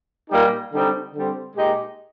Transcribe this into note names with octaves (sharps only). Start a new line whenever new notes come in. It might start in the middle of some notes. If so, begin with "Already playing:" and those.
A#2 G3 A#3 D#4 G4
D3 G3 C4 D#4
D3 G3 C4
A#2 G#3 D#4 G4